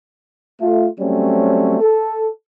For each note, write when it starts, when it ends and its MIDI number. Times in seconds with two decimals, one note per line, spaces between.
0.61 0.88 57
0.61 0.88 65
1.00 1.78 54
1.00 1.78 55
1.00 1.78 57
1.00 1.78 60
1.00 1.78 61
1.81 2.28 69